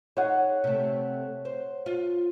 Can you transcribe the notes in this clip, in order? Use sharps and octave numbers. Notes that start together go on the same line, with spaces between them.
D#4 G#4 C#5 F#5
C3 A3
C5
F4